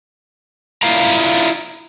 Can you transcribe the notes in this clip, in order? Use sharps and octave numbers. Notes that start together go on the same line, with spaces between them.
E4 F4 F5 A#5